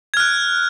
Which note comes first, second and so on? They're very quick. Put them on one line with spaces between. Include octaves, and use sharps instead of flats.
G#6 F6 F#6